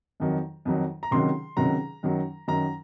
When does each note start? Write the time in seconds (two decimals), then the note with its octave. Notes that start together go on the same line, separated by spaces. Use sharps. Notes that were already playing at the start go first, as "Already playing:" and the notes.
0.20 F2 D#3 F#3
0.65 F2 D#3 F#3
1.03 A#5
1.11 C#2 C3 D#3 F#3 C6
1.57 C#2 C3 D#3 F#3 A#5
2.03 F#2 D#3 F#3
2.48 F#2 D#3 F#3 A#5